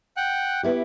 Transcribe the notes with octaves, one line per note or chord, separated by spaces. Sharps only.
F#5 G5 F#6
B3 E4 G4